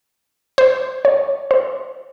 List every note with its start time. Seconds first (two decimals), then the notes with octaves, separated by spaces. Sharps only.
0.58 C5
1.05 C#5
1.51 C5